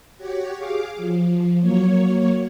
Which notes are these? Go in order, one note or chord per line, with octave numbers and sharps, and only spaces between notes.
F#4 G4 C#5
G#4 F5 D6
F3
F#3 A#3 C#5